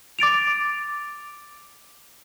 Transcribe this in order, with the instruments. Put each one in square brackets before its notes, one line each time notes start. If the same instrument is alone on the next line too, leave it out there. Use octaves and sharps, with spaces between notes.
[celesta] D6 A6 D7 F7